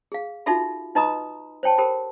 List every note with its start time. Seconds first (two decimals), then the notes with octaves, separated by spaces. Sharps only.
0.12 G#4 F5
0.46 D#4 F4 F#4 A4 E5 B5
0.95 D#4 B4 D#5 A#5 B5 D#6
1.63 C5 C#5 G5 A5
1.78 G4 A4 A#4 C5 G5 B5